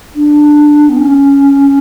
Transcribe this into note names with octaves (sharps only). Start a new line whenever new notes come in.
D4
B3
C#4